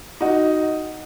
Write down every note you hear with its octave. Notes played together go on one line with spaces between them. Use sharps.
D#4 F#4